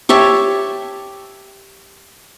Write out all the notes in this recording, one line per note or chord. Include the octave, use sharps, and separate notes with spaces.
G4 C#5 E5 A5